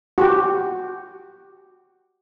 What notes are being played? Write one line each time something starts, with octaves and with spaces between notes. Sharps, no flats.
F#4 G4